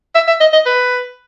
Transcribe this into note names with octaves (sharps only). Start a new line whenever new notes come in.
E5
E5
D#5
D#5
B4